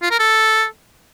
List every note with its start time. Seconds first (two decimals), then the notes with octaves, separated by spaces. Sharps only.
0.02 F4
0.11 A#4
0.20 A4